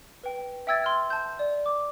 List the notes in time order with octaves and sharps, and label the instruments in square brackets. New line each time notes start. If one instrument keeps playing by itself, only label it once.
[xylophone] B4 G5
E5 G5 E6 G#6 A6
C6 F6 G#6
A5 G6
D5
D6